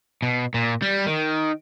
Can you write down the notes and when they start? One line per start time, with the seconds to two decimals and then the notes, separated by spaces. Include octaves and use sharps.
0.23 B2
0.54 A#2
0.82 G3
1.06 D#3